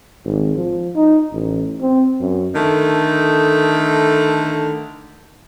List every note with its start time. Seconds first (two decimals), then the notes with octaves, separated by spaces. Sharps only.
0.24 G#1
0.56 F3
0.95 D#4
1.33 A1
1.81 C4
2.21 F#2
2.54 D3 D#3 A3